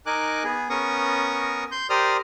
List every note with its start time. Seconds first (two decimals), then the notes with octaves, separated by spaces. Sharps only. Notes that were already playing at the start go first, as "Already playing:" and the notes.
0.06 D#4 A#4 G#5 D6 F#6
0.44 B3 G#4
0.70 B3 C#4 A#4 C#6 D#6
1.71 C6 G6
1.90 G4 A#4 C5 D5 D#6 F6